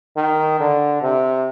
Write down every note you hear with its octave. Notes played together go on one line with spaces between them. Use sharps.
D#3
D3
C3